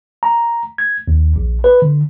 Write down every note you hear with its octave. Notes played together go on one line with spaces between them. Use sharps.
A#5
G#6
D#2
A#1
B4
D3